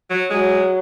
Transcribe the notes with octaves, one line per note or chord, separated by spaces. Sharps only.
F#3
F#3 G#3